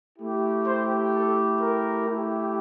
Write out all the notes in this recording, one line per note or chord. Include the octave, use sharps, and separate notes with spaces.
A3 E4 G4
C5
A4
A#4
A3 E4 G4